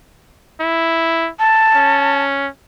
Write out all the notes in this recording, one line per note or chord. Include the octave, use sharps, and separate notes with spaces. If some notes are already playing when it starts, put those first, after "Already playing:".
E4
A5
C#4